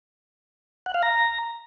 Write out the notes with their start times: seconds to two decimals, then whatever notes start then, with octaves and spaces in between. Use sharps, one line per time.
0.86 F#5
0.94 F5
1.03 A#5